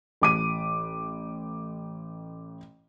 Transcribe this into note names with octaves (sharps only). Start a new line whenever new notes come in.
A1 D6 D#7